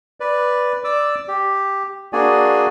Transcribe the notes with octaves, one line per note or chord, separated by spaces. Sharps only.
B4 D5
D5 D6 E6
G4
A#3 D4 F#4 G#4 D5 G#5